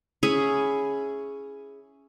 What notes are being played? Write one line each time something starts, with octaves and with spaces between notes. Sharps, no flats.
C#4 E4 G#4 B5